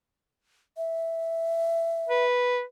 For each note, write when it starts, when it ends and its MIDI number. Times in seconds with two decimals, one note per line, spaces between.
0.77 2.25 76
2.09 2.62 71